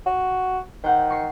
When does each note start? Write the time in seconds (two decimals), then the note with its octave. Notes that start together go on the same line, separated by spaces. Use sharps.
0.06 F#4
0.84 D#3 C5 F#5
1.10 C#6 C7 C#7